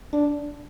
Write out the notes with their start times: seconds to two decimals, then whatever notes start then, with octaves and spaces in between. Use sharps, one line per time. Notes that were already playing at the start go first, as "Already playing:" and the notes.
0.13 D4